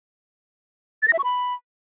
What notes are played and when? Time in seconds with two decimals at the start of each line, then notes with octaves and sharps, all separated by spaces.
1.02 A6
1.08 A#6
1.13 E5
1.19 C#6
1.24 B5